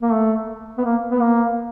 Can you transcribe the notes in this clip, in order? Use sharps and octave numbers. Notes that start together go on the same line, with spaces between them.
A#3
A3
B3
A#3
B3
A#3